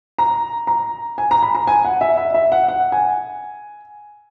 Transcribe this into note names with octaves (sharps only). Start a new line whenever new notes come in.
A#5
A#5
G#5
A#5
B5
A#5
G#5
F#5
E5
E5
E5
F#5
F#5
G#5